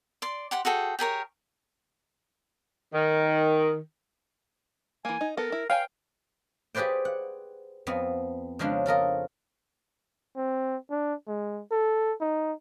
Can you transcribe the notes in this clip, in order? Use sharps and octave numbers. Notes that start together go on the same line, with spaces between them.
D5 C6
G4 F#5 C6
F#4 G#4 A4 G5
G4 G#4 A#4 C#5
D#3
E3 A#3 G#5
D#4
B3 A4 A#4
E4
B4 C#5 F5 G5 G#5
G4 G#4 B4 C5 D5 G5
F#5
F2 B3 C4
C#3 F3 G#3 C#4 D4
F4 A4 A#4 D#5
C4
D4
G#3
A4
D#4